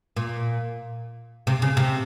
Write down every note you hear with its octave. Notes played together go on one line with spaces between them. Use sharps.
A#2
C3
C#3
C3